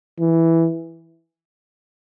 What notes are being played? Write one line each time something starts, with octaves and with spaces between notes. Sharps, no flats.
E3